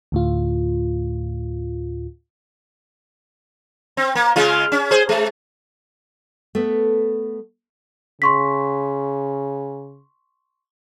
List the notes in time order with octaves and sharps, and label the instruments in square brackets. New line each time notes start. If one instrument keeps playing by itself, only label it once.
[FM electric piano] D2 A2 F4
[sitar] C4
A#3
C#3 G#3 F4
C#4
G#4 C5
G#3
[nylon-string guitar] A3 B3
[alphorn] C#3 [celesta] C6 C#6 B6